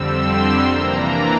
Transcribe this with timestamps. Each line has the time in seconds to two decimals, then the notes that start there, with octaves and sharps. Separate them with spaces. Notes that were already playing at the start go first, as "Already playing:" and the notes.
Already playing: F2 D3 G3 C4 E6
0.11 C6
0.62 C3 E3 A#3 D4 A#5